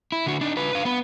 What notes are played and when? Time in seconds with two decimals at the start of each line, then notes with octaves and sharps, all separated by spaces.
0.12 E4
0.26 D3 F#4
0.41 D4 D#4
0.57 F4 B4
0.73 B4 F5
0.85 B3 B4